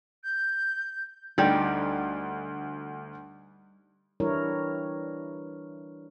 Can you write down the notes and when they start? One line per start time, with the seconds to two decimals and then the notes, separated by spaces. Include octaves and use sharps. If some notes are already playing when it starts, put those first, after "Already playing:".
0.24 G6
1.38 D2 G3 D#4 G4
4.20 E3 G3 D4 E4 A#4 C#5